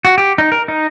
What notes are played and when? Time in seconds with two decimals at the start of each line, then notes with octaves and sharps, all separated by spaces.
0.05 F#4
0.18 G4
0.38 D#4
0.52 A#4
0.68 D#4